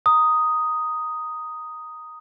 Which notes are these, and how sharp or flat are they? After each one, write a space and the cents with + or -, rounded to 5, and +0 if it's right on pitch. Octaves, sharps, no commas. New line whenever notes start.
A#5 +0 D#6 +0